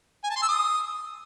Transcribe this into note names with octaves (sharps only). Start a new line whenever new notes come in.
G#5
A5
C6
E6
D#6